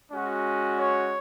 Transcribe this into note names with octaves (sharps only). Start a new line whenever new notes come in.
G#3 C#4 F#4
C#5